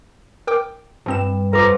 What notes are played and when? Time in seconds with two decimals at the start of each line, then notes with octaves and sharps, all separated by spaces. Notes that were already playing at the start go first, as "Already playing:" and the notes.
0.47 A#4 G5 D6
1.06 G2 F3 C4 E7
1.53 F2 B4 A#5 D6